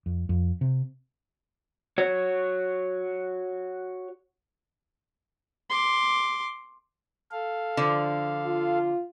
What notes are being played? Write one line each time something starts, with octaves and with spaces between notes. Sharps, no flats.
F2
F2
C3
F#4 C#5
C6 D6
A4 F5
D3 F3
F4